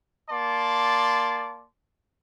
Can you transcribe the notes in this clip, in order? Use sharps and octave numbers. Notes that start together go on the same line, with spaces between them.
A#3 D5 A5 C6